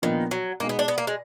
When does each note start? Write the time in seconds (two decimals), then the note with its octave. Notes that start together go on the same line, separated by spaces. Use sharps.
0.02 A#2 D#3 F3 B3 D4 F4
0.31 F#3
0.60 B2 G#3 A#3 D#4 G#4
0.69 B3
0.79 D4
0.88 B3
0.98 A#3
1.07 G#3